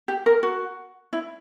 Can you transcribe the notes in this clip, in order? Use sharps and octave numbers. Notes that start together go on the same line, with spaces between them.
G4
A#4
F#4
E4